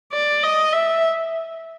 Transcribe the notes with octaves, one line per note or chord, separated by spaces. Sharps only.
D5
D#5
E5